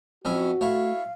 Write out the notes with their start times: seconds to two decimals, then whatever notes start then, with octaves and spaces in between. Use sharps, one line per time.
0.25 F2 C#4 E4 F#4
0.61 A3 E4 C#5 F5